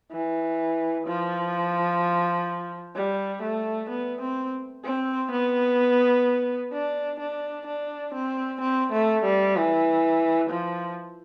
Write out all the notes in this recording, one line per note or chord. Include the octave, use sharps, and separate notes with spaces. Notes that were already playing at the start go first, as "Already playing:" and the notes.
E3
F3
G3
A3
B3
C4
C4
B3
D4
D4
D4
C4
C4
A3
G3
E3
F3